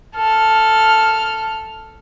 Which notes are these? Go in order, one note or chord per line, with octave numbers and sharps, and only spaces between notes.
A4 F6